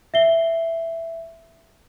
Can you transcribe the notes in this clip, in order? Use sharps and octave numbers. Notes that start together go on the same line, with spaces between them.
E5 C7 G7